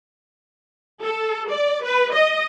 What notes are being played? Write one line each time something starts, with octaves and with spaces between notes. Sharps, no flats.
A4
D5
B4
D#5